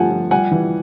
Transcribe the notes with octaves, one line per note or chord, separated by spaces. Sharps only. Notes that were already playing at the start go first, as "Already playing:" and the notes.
Already playing: G2 F3 A3 F#5 G#5 A5
F3
G3 F#5 G#5
E3